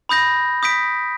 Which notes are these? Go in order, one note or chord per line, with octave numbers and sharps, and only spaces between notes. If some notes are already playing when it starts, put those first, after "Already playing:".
B5 D#6 G6 A#6
D#6 G6 B6 D7